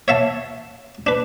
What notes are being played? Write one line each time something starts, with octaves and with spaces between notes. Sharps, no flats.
C#5 E5 F5 A5
D4 B4